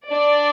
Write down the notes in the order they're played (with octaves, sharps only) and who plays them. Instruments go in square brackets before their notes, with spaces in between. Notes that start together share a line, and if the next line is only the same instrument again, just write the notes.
[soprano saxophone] D4 [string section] D5